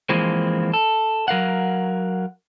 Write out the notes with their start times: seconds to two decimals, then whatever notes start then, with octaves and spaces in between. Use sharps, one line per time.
0.09 E3 F3 G#3 A#3 C4
0.74 A4
1.28 F#3 A#4 F5 F#5